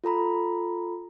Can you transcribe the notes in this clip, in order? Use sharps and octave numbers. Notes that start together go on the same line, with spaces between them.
F4 A4 A#5 B5